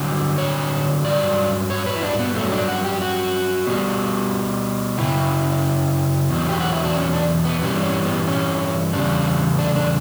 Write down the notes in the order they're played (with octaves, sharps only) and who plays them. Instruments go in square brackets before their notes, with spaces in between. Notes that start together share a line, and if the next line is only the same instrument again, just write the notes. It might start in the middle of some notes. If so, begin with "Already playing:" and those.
Already playing: [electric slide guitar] G2 D3 F#3
C#5
G2 F#3 D5
C#5
B4
E4
D4
B3
G2 F#3 A3
D4
F#4
G4
F#4
B2 G3
F#2 C#3 E4
E2 B2 F#3
G4
F#4
E4
D4
C#4
D4
B3
G2 E3 G3 C#4
C#4
B3
C#4
E2 C#3 G3 D4
D4
D4